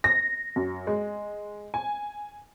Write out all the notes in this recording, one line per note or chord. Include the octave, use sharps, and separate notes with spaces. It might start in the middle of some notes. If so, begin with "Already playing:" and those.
A#6
F#2
G#3
G#5